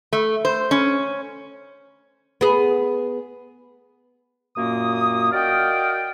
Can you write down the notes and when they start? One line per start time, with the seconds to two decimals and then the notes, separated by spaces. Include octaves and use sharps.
0.13 A3
0.45 C5
0.71 C#4
2.41 B3 G#4
4.56 F#2 A#2 A#3 D#6
5.32 F#4 A#4 D5 D#5 F5 G5